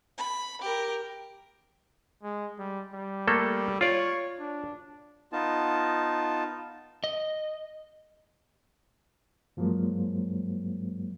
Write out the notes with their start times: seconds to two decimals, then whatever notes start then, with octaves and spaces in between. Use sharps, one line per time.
0.17 B5
0.61 G4 A#4
2.23 G#3
2.59 G3
2.93 G3
3.28 A3 A#3 A4
3.81 F4 C#5 D5
4.40 D4
5.32 B3 D#4 F4 A5
7.04 D#5
9.57 G2 F3 F#3 G#3 A#3